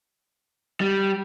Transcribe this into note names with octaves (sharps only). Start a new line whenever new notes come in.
G3